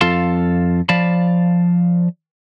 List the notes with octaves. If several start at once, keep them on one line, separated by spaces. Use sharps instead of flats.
F2 F4 A4 F5 A5 C6
F3 D5 F5 A5 B5